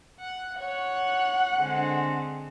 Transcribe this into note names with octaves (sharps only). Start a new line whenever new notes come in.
F#5
C#5 F#5
D3 G#3 C4